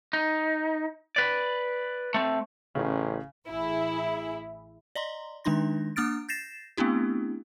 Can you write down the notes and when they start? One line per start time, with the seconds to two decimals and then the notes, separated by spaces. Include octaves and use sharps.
0.13 D#4
1.16 B4 D5
2.14 A3 C4
2.75 A1 C#3
3.47 A1 E4 G#4
4.95 D5 D#5 A#5 C6
5.44 D#3 G#3 D4 D#4 C6 A#6
5.96 A#3 D4 D#6 F6 A6 D7
6.29 G6 A6 A#6 C7 E7
6.77 A3 B3 C4 D4 E4 G4